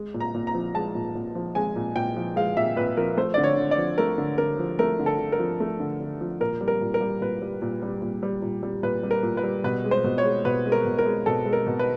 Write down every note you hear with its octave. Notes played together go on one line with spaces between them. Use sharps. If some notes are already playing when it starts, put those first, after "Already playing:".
Already playing: G#3
A#2
A#5
A#2
A#5
F3
G#3 A5
A#2
A#2
F3
G#3 G#5
A#2
A#2 G5
F3
G#3 F5
A#2 E5
A#2 B4
F3 A#4
A3 C5
D3 D5
C#5
D3
D5
F3
A3 A#4
D3
D3 A#4
F3
A3 A#4
D3
A4
D3
A#4
F3
A3
D3
D3
F3
A#2 A#4
G3
A#4
A#2
A#4
G3
A#2 B4
G3
A#2
G3
A#2
G3
A#2
G3
A#2 B4
G3
A#4
A#2
B4
G3
B2 B4
G#3
C5
B2
C#5
G#3
B2 B4
G#3
A#4
B2
A#4
G#3
B2 A4
G#3
A#4
B2
B4